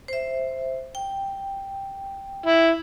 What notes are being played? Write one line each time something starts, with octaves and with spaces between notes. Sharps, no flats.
C5 E5
G5
E4